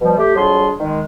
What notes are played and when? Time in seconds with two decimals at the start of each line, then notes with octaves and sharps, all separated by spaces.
0.01 B2 F3 G3
0.17 A3 G4
0.35 F2 F#3 G3 D4 G#4 C6
0.80 D#3 G#3